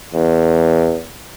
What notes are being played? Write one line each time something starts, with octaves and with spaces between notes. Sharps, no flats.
E2